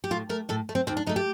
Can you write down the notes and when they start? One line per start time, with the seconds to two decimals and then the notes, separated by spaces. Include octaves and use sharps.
0.04 G4
0.11 A2 F4
0.29 A3 A#4
0.49 A2 A4
0.69 A3
0.75 C4
0.87 D#2 C4
0.97 D4
1.06 D3 A3 D#4
1.16 G4